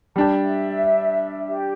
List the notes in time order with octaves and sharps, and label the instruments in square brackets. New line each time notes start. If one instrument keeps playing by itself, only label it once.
[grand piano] G3 D4 G4 [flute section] A5
[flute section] E5
G4